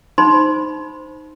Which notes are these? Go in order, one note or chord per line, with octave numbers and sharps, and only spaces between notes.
D#4 C5 B5 C6